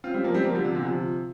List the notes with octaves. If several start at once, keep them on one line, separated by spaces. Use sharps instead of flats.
C4 F4
G3 C4
F3 A#3
G3 C4
F3 A#3
D3 G3
C3 F3
A#2 D3
C3 F3